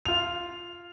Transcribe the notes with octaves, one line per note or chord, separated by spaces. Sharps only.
F4 F7